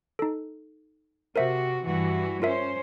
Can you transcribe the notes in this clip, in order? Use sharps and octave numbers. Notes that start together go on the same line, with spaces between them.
D#4 A4
C3 F#4 A#4 C5 E5
G2 E3 F#4
C#4 F4 A#4 C5 E5